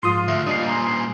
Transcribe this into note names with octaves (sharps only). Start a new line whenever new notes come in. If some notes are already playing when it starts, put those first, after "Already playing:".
G#2 F3 F4 C6 D#6
D2 E5
A#2 G3 D4 D#5 D#6 C7
G#5 A#5 C6